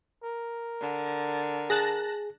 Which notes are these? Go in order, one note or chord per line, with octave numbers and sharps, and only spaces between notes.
A#4
D3
G#4 A5 F#6 A#6